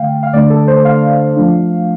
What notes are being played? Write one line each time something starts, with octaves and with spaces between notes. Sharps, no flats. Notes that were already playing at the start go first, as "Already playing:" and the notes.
Already playing: D3 A3 F5 G5
F5
D3 A3 D4 D5
A4
C5
F5
F3 A3 D4